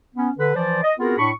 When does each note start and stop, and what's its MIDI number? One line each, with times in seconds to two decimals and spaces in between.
0.15 0.30 59
0.15 0.30 61
0.38 0.52 50
0.38 0.52 71
0.55 0.80 52
0.55 0.80 53
0.55 0.80 72
0.55 0.80 74
0.84 0.93 75
0.99 1.18 59
0.99 1.18 60
0.99 1.18 65
0.99 1.18 66
0.99 1.18 68
0.99 1.18 70
1.18 1.32 45
1.18 1.32 62
1.18 1.32 83
1.18 1.32 85